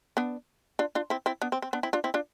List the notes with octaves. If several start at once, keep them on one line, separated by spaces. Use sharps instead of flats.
B3 D4
D4 F4
D4 F4
C4 E4
C4 E4
B3 D4
C4
C4
B3 D4
C4 E4
D4 F4
C4 E4
D4 F4